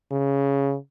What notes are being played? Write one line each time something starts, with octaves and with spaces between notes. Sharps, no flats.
C#3